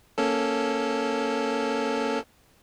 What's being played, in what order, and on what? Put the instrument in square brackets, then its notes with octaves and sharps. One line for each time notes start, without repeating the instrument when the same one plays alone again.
[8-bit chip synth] A#3 C#4 A4